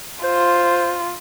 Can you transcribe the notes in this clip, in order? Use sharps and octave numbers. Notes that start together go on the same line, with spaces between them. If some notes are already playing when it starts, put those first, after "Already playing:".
F4 C5